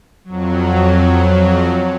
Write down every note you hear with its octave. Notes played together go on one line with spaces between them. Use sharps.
F2 F#3